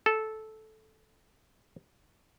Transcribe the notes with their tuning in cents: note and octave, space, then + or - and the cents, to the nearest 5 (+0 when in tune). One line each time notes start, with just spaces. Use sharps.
A4 -10